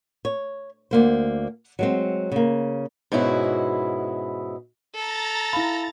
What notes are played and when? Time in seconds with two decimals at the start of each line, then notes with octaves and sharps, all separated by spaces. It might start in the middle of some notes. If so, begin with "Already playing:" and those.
0.25 C#5
0.91 D2 A#3 C5
1.79 F#3 G#3 C4
2.32 C#3 A#3
3.12 G#2 B2 C#4 E4 F#4
4.95 A4 A#5 A6
5.53 E4 F5 B5 A#6